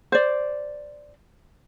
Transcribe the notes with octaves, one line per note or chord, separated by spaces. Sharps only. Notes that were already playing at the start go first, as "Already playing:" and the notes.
C5 D5